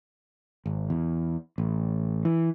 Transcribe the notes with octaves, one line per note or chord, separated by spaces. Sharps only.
G#1
E2
A1
E3